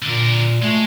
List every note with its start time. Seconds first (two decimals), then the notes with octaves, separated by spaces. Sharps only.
0.02 A#2 D3 A#4
0.62 G#3 A3